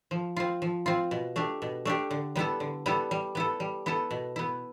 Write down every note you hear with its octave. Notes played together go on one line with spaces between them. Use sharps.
F3
C4 F4
F3
C4 F4
B2
A3 D4 G4
B2
A3 D4 G4
D3
G3 B3 E4 A4
D3
G3 B3 E4 A4
G3
B3 E4 A4
G3
B3 E4 A4
B2
B3 E4